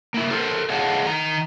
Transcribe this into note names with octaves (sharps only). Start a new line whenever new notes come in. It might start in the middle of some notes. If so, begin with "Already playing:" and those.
A#3 E4
A4 A#4 C5
G#4 C#5 D#5 F5 F#5 A5
D#3 A#5